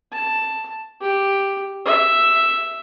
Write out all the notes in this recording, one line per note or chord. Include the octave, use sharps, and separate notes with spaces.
A5
G4
E5